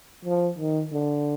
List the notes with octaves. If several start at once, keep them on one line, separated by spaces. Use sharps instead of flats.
F3
D#3
D3